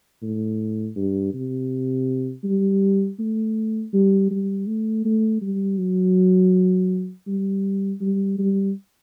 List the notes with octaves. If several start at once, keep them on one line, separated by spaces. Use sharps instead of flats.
A2
G2
C3
G3
A3
G3
G3
A3
A3
G3
F#3
G3
G3
G3